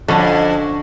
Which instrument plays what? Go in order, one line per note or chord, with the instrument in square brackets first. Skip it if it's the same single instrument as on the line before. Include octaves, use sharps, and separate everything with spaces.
[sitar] F2 [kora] D3 C#4 [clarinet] F#4